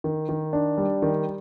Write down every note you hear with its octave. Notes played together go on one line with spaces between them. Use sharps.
D#3
D#3
D4
G3
D#3